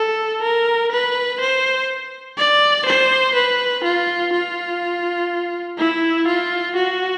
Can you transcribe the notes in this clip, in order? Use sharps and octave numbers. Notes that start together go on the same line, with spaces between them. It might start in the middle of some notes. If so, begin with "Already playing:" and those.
Already playing: A4
A#4
B4
C5
D5
C5
B4
F4
F4
E4
F4
F#4